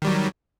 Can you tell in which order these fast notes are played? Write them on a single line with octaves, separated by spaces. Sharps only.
D#3 G3 F#3